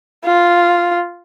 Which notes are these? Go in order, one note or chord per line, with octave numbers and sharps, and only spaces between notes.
F4